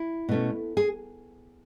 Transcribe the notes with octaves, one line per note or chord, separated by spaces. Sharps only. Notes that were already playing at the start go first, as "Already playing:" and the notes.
Already playing: E4
B2 A3 C#4
G#4